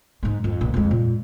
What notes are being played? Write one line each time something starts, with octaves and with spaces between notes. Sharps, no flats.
G#2 G#3
F2
A#1
F2 G#3
A#2